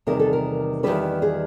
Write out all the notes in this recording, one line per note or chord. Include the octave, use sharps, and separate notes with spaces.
E2 C3 D#3 G3 A#4
A4
A#4
E2 C3 D#3 G3 B4
G#4